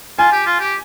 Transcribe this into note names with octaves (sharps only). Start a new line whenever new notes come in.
F4 G#5
G4
F4
G4